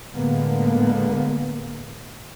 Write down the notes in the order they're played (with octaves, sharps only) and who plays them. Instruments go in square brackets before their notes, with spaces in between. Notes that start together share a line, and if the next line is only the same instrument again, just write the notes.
[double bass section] A2 D3 G#3 A#3 B3